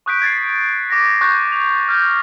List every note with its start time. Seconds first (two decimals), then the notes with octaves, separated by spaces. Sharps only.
0.06 C#6 D#6 F#6 G6 B6 D7
0.22 G#6 A6 B6 C7
0.90 D6 A#6
1.21 C#6 F#6 G6 A6
1.48 A6 F7
1.89 F6 G6